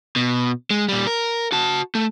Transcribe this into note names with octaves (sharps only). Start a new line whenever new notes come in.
B2
G#3
A#2 G3
A#4
F#4 A5
A3